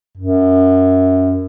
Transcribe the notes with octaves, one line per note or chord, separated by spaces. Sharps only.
F#2